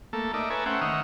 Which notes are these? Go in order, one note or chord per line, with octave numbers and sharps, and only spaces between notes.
A3 A#3 A4
D#4 A#4 D5 E5
A4 B4 C#5 E5 G#5 A#5
A3 C#4 C5 E5 F#5 G5
D#3 E5 F#5 D#6 F6